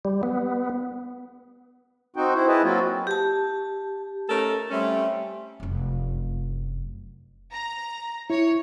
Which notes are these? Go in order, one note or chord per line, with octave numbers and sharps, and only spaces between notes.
G3
B3
C4 D#4 F#4 G5
E4 C5
E4 G#4 B4 D#5 A5
F#3 A#3 C4 F4 F#4
G4 A5
A3 C#4 D#4 A4 A#4
G3 A3 C4 C#4
F1 F#2
A#5
E4 C#5